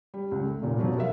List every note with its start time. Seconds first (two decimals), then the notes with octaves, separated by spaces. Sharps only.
0.14 G3
0.31 C#2
0.45 A3
0.62 F1 A#2
0.78 B2 F3 F#3
0.98 A#4 E5 F5